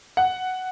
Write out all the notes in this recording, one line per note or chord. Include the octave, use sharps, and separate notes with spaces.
F#5